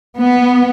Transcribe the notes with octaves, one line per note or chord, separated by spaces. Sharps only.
B3